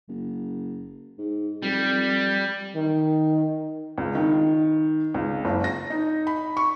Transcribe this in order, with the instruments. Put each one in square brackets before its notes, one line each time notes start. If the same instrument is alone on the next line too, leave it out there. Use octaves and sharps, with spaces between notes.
[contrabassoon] F#1
G#2
[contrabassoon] F2 [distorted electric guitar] G3
[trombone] D#3
[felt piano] C#2
D#3
C#2
F#1
A#6
D#4
B5
C#6